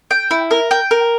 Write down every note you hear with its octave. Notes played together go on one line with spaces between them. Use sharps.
G5
E4
A#4
G5
A#4